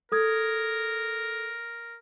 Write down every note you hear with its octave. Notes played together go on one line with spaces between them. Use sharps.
A4 A#4 D#6 G#6